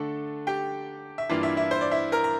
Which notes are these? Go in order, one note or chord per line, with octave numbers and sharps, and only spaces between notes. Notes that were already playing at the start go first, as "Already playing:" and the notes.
Already playing: D3 A3 D4 A4
G4 G5
E5
G2 E3 A#3 D4 F4 F5
E4 E5
E4 E5
C5
D5
E4 E5
A#4 A#5
A#5